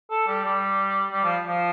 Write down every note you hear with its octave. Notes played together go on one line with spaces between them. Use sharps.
A4
G3
G3
G3
F3
F3